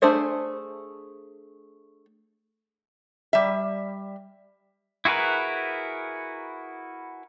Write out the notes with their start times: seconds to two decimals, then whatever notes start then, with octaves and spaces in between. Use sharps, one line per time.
0.02 A3 D4 G#4 C5 E5
3.33 G3 E5
5.05 E4 F#4 G#4 A#4 B4